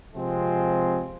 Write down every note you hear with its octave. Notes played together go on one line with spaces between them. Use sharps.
C3 F3 G#3 C4